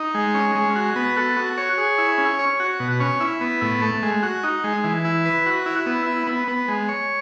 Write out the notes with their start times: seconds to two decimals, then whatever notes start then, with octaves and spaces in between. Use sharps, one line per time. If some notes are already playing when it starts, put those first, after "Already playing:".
Already playing: D#4
0.15 G#3
0.35 C#4
0.55 G#3
0.76 F#4
0.96 B3
1.17 A4
1.37 F#4
1.58 C#5
1.78 G#4
1.98 E4
2.18 C#4
2.39 C#5
2.60 F#4
2.80 B2
3.00 C#4
3.20 E4
3.41 B3
3.62 A2
3.82 A3
4.03 G#3
4.23 F#4
4.43 D#4
4.64 G#3
4.84 E3
5.05 E4
5.25 B4
5.46 F#4
5.66 E4
5.86 B3
6.06 E4
6.27 B3
6.48 B3
6.68 G#3
6.89 C#5